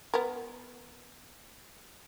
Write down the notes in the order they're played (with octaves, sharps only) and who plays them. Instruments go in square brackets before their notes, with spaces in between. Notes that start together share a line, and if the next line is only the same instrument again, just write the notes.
[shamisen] B3 A#4